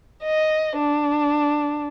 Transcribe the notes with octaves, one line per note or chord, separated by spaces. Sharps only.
D#5
D4